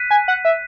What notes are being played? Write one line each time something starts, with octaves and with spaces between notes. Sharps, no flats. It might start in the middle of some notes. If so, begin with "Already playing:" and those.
Already playing: F#6 B6 D#7
G#5
F#5
E5